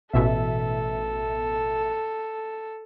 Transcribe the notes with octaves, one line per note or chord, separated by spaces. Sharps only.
A1 B2 A4 E5